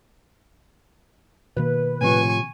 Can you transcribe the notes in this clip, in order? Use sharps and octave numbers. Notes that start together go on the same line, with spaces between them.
B2 D#3 A#3 B4
A2 C3 F3 G#5 C#6